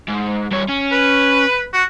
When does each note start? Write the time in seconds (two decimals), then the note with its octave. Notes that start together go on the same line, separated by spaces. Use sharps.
0.09 G#2
0.52 G2 C#5
0.69 C#4
0.92 B4
1.73 F#4